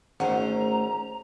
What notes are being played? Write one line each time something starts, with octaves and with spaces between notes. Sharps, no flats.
G#1 A3 C#4 C5 F#5 A#5